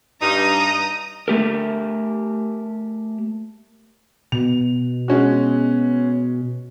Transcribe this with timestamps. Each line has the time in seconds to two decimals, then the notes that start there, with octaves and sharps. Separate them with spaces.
0.21 G2 D#4 A#5 D#6
1.28 A3 G4 A#4
4.32 B2 F7
5.08 G#3 C#4 F#4